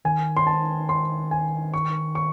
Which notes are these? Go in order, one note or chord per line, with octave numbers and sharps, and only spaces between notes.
D#3 G#5
C6
A5
C6
G#5
C#6
C#6